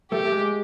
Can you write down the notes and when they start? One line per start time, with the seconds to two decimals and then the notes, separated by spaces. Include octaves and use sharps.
0.11 A3 G4
0.25 A3
0.32 G#3